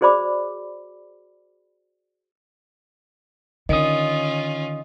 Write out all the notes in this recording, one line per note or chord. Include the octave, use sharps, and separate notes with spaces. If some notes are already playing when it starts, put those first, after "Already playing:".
F#4 G#4 C5 D5 B5 D6
D3 D#3 C#4 F4 D#5 D#6